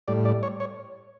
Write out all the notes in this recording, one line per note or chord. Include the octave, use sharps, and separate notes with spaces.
A2 G3 D5
D5
C#5
C#5